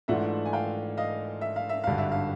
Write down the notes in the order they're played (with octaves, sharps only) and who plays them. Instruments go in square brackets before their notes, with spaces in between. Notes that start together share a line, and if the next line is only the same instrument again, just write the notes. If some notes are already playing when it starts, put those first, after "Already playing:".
[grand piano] G#2 E3 A3 D4 F4 [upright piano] E5 F#5
[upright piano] G#5
F5 G5
D#5 F5
E5
F5
E5
[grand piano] G#1 G2 D3 [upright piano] F5
[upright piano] E5
F5